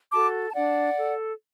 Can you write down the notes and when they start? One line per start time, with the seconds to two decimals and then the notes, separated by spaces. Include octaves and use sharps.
0.12 F#4 A4 A5 D6
0.49 A5
0.55 D4 D5 F#5
0.97 A4